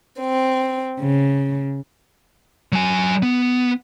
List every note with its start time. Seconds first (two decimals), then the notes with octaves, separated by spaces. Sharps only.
0.20 C4
0.99 C#3
2.72 F#3 G#5
3.22 B3